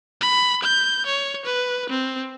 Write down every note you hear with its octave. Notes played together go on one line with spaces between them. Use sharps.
B5
G6
C#5
B4
C4